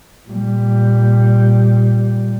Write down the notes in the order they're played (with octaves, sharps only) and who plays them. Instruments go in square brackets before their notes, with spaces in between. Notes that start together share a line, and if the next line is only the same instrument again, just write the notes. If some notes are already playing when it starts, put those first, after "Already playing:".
[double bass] A#2 G3